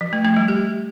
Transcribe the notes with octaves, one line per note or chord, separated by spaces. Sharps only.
F3
A3
A3
G3
G4